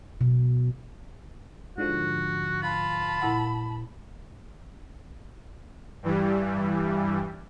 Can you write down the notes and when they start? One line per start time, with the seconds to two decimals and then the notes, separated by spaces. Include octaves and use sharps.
0.21 B2
1.78 G#2 D3 F3 F#4
2.63 F4 A5 B5
3.21 A#2 E4 F#5
6.03 G2 E3 G3